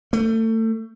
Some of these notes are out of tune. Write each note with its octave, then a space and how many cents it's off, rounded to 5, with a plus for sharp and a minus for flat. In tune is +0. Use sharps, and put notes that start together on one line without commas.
A3 +30